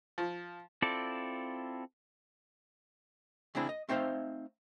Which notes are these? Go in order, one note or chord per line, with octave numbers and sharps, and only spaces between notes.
F3
C4 E4 F4 A4 D5
C#3 E3 C4 D4 E4 G#4
D#5
A3 C4 D#4 C5 E5 F5